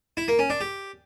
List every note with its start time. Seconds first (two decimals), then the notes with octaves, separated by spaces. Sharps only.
0.17 E4
0.28 A#3
0.39 C#4
0.50 D4
0.61 G4